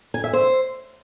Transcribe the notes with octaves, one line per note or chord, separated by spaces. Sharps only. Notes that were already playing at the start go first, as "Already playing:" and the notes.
G#5
E5
C5